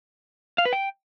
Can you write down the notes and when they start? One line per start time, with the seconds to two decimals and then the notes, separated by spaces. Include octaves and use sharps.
0.58 F5
0.65 B4
0.73 G5